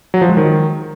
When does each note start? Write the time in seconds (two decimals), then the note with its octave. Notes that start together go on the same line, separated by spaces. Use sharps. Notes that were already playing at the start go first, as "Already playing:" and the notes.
0.14 F#3
0.21 F3
0.29 G#3
0.37 D#3